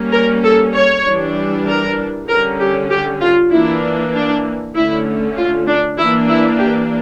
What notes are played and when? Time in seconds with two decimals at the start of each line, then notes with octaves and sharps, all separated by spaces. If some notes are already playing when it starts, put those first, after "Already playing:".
Already playing: G3 A#3 C#4
0.12 A#4
0.43 A4
0.74 C#5
1.05 E3 G3 D4
1.67 A#4
2.28 D3 G3 C#4 A#4
2.59 G4
2.90 G4
3.20 F4
3.51 E3 A#3 D4 E4
4.13 D4
4.75 D3 A3 C#4 E4
5.37 F4
5.67 D4
5.97 E3 A#3 D4 E4
6.28 E4
6.59 G4